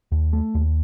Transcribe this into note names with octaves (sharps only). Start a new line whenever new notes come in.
D#2
A3
D#2